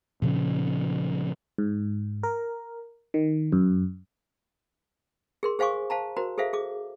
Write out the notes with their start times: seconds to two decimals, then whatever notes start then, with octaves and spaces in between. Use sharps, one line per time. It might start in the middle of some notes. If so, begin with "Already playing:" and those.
0.22 A#2 C#3 F3 C#4
1.58 G#2
2.23 A#4
3.14 D#3
3.52 F#2
5.43 G#4 A#4 C6
5.59 G#4 C5 F5 G#5 C#6 D6
5.90 C5 F5 A5 A#5
6.17 F#4 A#4 C5 A#5
6.38 G#4 A4 C5 E5 F5
6.53 G#4 D6